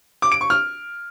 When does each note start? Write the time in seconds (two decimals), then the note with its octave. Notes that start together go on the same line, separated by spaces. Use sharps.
0.22 D6
0.32 D7
0.41 C#6
0.50 F6